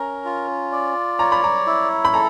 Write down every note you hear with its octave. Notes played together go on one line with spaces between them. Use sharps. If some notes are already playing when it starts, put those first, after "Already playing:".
Already playing: C#4 A#4 A#5
F4
D5
C#5 A#5
B5
A#5
E4
B5
A4 A#5